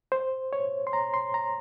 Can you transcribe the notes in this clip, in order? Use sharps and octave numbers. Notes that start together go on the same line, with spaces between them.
C5
C#5
C6
A#5
C6
A#5